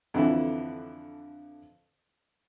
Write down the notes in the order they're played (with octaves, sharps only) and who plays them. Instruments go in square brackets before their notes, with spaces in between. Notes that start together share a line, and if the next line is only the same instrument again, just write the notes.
[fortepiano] F2 D3 E3 E4